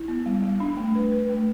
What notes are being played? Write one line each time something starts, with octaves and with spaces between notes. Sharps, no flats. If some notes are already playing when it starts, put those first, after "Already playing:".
Already playing: E4
B3
G3
G3
D4
A3
B4
B4
A3